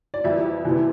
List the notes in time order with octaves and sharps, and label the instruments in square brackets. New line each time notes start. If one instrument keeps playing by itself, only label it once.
[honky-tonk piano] D5
F2 E3 G3 E5
C3 E3